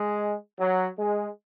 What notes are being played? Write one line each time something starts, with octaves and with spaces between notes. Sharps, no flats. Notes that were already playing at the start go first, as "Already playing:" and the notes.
Already playing: G#3
F#3
G#3